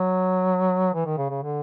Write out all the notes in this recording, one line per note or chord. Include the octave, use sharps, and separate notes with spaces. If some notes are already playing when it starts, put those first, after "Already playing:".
Already playing: F#3
E3
D#3
C#3
C#3
D3